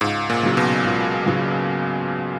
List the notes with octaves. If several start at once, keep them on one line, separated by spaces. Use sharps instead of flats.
C#2 G#2
A#2
C#3 F#3
B2
C#2
C#3 F#3